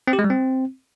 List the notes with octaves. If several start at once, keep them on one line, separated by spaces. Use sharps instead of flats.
C4
G4
G#3
G3
C4